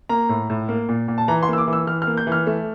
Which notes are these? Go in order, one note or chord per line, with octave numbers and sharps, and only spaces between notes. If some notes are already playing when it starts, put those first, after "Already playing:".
A#3 A#5
A2
A2
A#3
A#2
A#2
A5
E3 A#5
C6
A#3
E6
D6
E3
E6
E3 F6
F6
A#3
G6
E3
F6
A3